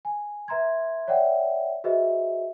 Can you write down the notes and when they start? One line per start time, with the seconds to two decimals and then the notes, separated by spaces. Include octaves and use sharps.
0.05 G#5
0.48 B4 E5 A#5 C6 G#6
1.08 C#5 D5 E5 F#5 G5
1.84 F#4 G#4 B4 C5 D#5 E5